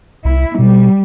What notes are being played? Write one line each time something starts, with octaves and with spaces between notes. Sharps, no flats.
C2 E4
B2 G3